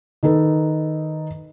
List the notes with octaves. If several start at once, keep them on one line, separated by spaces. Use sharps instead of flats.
D#3 D#4 A4 B4